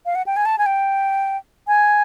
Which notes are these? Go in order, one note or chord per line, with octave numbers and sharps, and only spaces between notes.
F5
F#5
G5
G#5
A5
G#5
G5
G#5